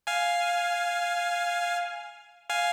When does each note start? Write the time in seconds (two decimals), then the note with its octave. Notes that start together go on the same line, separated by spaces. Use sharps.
0.07 F5 G#5
2.50 F5 G#5